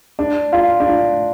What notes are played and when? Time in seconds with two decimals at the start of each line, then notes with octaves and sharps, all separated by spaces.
0.19 D4
0.53 F4
0.80 D4
0.87 F4